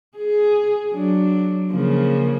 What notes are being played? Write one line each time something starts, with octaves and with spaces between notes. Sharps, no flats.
G#4
F#3 D4
C#3 F3 A#3